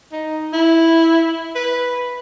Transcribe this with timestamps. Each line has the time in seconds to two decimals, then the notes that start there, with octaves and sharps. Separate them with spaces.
0.12 D#4
0.53 E4
1.55 B4